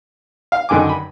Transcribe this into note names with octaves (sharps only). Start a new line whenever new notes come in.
F5
F#2 D3 D#3 G#5 D6
B5